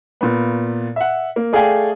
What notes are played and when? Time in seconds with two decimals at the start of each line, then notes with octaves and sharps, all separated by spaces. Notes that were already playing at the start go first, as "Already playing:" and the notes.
0.21 A#2 B3
0.96 E5 F#5
1.36 A#3
1.53 A3 G#4 D5 F5 G5 G#5